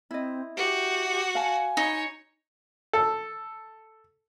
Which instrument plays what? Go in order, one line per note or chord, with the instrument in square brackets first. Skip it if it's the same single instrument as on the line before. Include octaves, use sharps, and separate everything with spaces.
[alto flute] C4 [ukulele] E4 D#5
[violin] F#4 [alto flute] G4
[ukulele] F5 A5 [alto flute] G#5
[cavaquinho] D#4 [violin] C#5
[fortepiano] A4